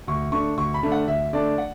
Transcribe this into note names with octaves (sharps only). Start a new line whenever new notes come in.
D2 C#6
D3 A3 D4 C#6
D2 C#6
B5
D3 A3 D4
F#5
D2 E5
D3 A3 D4 D5
F#5